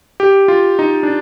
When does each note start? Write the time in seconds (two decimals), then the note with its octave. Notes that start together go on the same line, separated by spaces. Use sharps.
0.20 G4
0.48 F4
0.79 D#4
1.03 D4